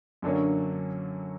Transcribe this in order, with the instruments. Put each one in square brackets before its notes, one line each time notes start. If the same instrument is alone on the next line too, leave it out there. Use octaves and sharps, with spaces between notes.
[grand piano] F#2 D3 F#3 A#3 C#4 [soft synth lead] D4